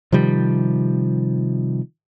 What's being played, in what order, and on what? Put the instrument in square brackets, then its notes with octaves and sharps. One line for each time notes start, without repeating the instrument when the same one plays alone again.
[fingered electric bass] C3 D#3 F3 G3